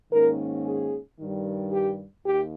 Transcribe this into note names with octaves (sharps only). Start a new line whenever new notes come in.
G#2 D#3 A#3 C#4 A#4
G#4
G2 D#3 G3
G4
D#2 G4